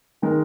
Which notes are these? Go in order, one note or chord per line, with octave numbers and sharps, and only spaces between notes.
D#3 G#3 D#4 A#4